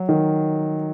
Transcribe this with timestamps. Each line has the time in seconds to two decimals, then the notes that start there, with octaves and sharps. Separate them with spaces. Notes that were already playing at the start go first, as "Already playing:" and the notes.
Already playing: F#3
0.09 D#3